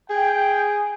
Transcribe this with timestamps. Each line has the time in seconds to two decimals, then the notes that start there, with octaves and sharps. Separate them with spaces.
0.10 G#4 G5